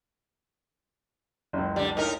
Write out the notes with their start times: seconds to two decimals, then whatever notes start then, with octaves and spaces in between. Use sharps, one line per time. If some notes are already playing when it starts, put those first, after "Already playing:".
1.53 F#1 C#2
1.76 D3 G3
1.97 A2 D#4 A#4